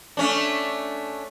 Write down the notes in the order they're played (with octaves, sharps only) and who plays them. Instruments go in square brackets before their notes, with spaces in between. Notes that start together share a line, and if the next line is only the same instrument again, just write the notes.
[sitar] A3 C#4 D4